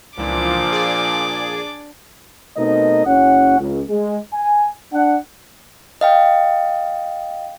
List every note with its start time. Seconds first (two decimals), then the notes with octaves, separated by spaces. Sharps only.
0.18 C#2 A#2 E3 F3 D4 D6
0.72 G#4 D5
2.57 B2 A3 C4 D#4 A#4 D#5
3.06 F#1 C#4 F#5
3.60 C#2
3.89 G#3
4.33 G#5
4.93 D4 F#5
6.01 D#5 F5 G5